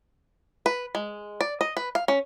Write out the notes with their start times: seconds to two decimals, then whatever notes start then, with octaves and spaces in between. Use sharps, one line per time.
0.66 B4
0.95 G#3
1.41 D5
1.61 D#5
1.77 B4
1.95 F5
2.08 C#4